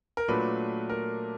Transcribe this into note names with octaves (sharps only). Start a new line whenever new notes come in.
A#4
A#2 F#3 A3 D4 B4
A#4